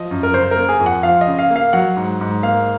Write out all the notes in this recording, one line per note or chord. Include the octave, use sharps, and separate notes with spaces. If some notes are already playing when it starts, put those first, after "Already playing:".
Already playing: F3 D#5
F#2
A#4
C#3 C5
A#4
A#3
G#4
F2
F#5
F3 F5
D#5
C#3
F5
A#3
F5
F#3 F#5
G#2
G#2
A#3 F5